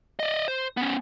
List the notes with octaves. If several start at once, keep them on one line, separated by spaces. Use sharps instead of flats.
D5 D#5
C5
B3 C#4